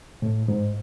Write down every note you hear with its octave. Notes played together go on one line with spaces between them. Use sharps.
A2
G#2